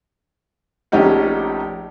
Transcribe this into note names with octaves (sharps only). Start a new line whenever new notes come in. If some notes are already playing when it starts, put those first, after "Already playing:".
A#1 A3 C#4 D#4 G4 F#5